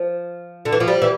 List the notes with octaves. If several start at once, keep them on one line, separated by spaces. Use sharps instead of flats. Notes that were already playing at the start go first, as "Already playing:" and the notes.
Already playing: F3
D3
E3
F3
G3
E3